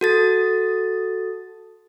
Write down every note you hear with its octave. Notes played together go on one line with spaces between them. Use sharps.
F#4 A4 A6